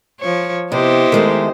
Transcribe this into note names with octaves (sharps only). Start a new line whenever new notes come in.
F3 C#5
C3 B3 E4 G4 C5 D#5
D#3 G#3 A3